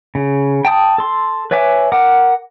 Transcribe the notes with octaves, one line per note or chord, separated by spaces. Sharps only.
C#3
G5 A5 D#6
A4 C6
B4 C#5 E5 G#5 D6
A#4 F#5 D6